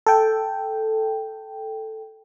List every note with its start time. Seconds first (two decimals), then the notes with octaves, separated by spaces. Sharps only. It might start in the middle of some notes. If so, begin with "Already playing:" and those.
0.07 A4 G5